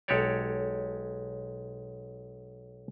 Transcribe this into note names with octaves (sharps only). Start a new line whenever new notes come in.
B1 G#3 G4 A4 C#5 D5